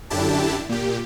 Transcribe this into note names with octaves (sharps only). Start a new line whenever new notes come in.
F#2 D3 D4 E4 G4 A5
A#2 G4